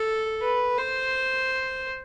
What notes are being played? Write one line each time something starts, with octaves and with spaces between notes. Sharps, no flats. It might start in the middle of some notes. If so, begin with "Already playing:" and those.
Already playing: A4
B4
C5